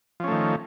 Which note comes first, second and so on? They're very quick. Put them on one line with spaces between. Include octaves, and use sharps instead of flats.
F3 C#4 A3 D#3